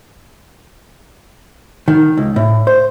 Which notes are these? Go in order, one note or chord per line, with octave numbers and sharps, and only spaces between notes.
D#3
C#2
A2
C5